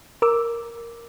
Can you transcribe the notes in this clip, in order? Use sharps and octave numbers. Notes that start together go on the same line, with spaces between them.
A#4 D6 E6